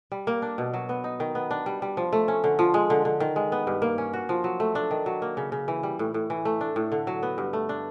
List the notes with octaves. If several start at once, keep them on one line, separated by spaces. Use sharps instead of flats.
G3
A#3
D4
B2
F#3
B3
D#4
D#3
B3
D4
G3
G3
F3
A3
C#4
D3
F3
G#3
D3
D3
D#3
G#3
B3
G2
A#3
C#4
F#4
F3
F#3
A3
D4
D#3
F#3
A#3
C#3
C#3
E3
G3
A2
A2
E3
A3
D4
A2
D3
F#3
B3
G2
A3
D4